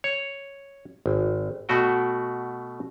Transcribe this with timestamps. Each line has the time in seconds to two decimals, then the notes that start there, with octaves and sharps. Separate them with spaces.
0.04 C#5
1.06 G#1
1.69 B2 A3 F#4 G5